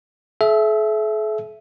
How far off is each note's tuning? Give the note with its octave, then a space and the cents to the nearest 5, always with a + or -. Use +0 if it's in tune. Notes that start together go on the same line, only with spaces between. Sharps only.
A4 -45 E5 +5